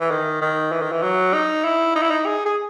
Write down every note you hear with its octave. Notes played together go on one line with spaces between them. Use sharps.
E3
D#3
D#3
E3
D#3
E3
F#3
D#4
E4
D#4
E4
D#4
G#4
G#4